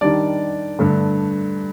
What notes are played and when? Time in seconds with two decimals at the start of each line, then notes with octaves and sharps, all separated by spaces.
0.01 D#3 G3 D4 D5
0.79 G2 D3 A3